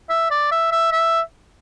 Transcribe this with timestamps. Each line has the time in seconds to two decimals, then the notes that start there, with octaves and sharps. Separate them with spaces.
0.10 E5
0.31 D5
0.51 E5
0.72 E5
0.92 E5